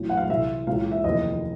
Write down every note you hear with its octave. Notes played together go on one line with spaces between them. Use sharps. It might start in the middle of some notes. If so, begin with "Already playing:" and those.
Already playing: B1 A2 E3
F#5
F5
C2 C3 E3 E5
C#2 C#3 E3 F5
E5
F1 D#2 C#3 E3 D#5